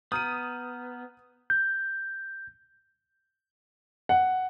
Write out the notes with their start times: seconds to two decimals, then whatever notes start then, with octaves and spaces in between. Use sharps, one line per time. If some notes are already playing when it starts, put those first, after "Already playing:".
0.12 B3 A#5 D#6 F6 G6 D#7
1.50 G6
4.09 F#5